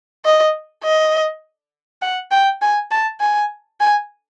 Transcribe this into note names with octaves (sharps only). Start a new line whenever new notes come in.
D#5
D#5
F#5
G5
G#5
A5
G#5
G#5